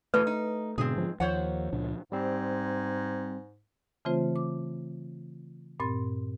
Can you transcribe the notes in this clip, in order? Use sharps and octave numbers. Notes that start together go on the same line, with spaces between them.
E2 B2 E3 A3 B4
D#4
G#2 B2 D3 C4 G#4
F3
D#2 F3 C5 C#5 F#5
C#2 A#2 D4
G#2 G3 C4
C#3 E3 A3 C4 F4 C5
D6
G2 A#2 C4 C6 A6